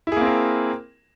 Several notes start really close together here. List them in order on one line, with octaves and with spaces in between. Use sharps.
E4 G#4 A#3 C4 A#4